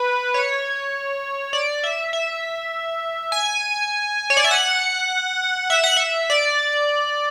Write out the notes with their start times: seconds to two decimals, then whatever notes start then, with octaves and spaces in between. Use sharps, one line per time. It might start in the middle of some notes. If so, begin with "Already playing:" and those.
Already playing: B4
0.34 C#5
1.53 D5
1.84 E5
2.13 E5
3.32 G#5
4.30 C#5
4.37 D5
4.44 E5
4.51 F#5
5.70 E5
5.84 F#5
5.97 E5
6.30 D5